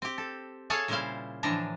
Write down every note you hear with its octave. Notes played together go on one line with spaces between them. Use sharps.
C4 G4
A4
G#4 A4 C#5 F5 A5
A#2 C#3 G3 E4 C5 F5
A2 D3 E3 F3 D4 A#5